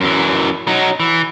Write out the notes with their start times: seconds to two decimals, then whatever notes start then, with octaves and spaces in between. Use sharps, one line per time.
0.01 F#2 E3
0.67 F#3 D#4
1.00 E3